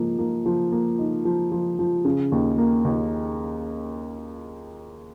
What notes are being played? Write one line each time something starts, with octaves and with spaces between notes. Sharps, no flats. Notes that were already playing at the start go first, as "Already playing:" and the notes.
Already playing: G#2 F3 A#3
A#3
F3
A#3
D#4
F3
F3
F3
C#3
D#2
A#3
D#2